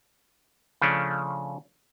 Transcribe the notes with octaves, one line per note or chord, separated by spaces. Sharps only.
C#3 F3 A3 C#4 D4